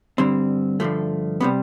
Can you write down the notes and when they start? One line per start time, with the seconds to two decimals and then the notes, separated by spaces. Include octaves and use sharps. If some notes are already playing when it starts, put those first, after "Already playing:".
0.18 G2 D3 G3 C4
0.80 G2 D3 F3 A3
1.41 C3 E3 G3 B3